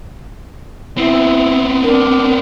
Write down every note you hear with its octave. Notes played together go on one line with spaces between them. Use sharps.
B3 C4 E4
D4 A#4